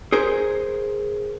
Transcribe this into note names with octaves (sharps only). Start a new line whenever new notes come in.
G#4 A#4 C5